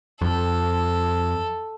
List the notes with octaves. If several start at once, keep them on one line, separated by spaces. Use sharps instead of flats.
F2 A4